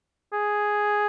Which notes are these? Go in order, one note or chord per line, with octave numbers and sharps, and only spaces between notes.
G#4